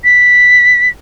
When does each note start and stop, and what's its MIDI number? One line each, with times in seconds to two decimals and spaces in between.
0.04 0.89 95